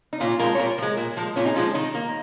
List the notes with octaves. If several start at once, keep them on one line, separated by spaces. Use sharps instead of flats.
D#4
A#2 C#4 F4
F3 G#3 F4 A#4
C#5
A#2 F4 A#4
F3 G#3
A#2
F3 G#3
A#2 C#4 F4
D#4 G#4
F3 G#3 C#4 F4
D#3 D#4
A#3